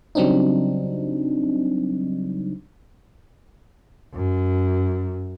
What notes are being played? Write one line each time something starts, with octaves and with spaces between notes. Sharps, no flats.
C#3 F#3 G3 C4 D4 D#4
F#2